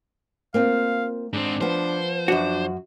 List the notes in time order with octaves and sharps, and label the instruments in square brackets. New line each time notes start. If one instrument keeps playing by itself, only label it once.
[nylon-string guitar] A#3 C4 F4 [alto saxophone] F5
[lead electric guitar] G#2 C4 [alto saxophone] D4
[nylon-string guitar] F3 B3 [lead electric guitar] C5
[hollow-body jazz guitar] F#2 F#4 [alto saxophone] D4